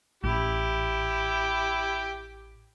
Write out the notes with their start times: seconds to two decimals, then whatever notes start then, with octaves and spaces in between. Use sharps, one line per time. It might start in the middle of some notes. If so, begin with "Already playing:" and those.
0.24 A1 E4 G4